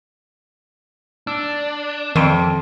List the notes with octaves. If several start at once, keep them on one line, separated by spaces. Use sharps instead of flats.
D4 E6
F2 D#3 C6 D7